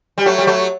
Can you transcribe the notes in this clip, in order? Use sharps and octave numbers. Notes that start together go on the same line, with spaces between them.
G3
F#3 A3
G3
F#3 A3